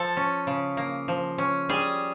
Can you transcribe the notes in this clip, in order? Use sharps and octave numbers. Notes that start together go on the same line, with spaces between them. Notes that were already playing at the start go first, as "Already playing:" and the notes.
Already playing: F3 A4
C#4
C#3
A#3
F3
C#4
G3 G#4